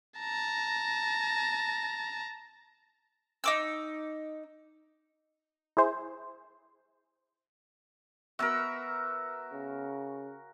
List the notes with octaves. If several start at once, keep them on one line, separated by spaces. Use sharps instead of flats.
A5 A#5
D#4 D6 E6
E4 G#4 C5
B3 F#4 A#4 E5
C#3